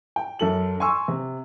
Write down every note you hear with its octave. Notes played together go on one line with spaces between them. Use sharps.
G5
F#2 A4 F#7
G#5 C6 C#6 E6
C3